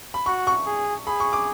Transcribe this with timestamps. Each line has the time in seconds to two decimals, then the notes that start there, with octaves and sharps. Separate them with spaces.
0.14 B5
0.26 F#4 C#6
0.47 C#6
0.67 G#4
1.07 G#4 B5
1.20 C#6
1.33 D6